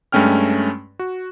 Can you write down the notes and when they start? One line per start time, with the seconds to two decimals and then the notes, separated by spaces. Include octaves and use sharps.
0.12 G2 G#3 A3 C#4 G5 F6
0.99 F#4